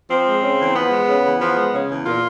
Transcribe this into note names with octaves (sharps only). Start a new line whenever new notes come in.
F3 C4
G#3
C#3
E2
F3 B3
G#3
C#3
E2
F3 B3
G#3
C#3
E2
A#2 F4